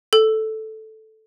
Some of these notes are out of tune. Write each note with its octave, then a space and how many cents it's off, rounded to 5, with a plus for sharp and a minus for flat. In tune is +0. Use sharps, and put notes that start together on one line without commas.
A4 -5